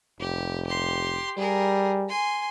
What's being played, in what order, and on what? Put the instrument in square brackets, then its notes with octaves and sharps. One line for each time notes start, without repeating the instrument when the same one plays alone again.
[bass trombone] F1 [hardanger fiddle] G4
[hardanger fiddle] G4 C6
[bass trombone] G3 [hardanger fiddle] G#4 A#4
[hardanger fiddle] G#5 C6